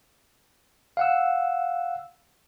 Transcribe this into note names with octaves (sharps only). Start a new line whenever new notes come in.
F5 F#5 E6